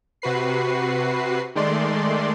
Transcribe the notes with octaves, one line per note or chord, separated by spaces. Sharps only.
C3 F#4 B4 C7
D#3 G#3 A3 D5 C6